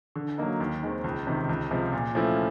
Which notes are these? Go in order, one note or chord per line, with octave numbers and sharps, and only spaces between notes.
D3
F#3 A#3 D#4
D#2
D#3 G#3 C4
C#2
C3 D#3
C#2
C3 F3 G#3
A#2
F3 A3 C#4 E4